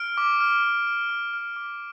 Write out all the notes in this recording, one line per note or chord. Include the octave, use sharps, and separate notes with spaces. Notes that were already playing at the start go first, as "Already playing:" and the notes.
Already playing: F6 D7
D6
F6
D6
F6
D6
F6
D6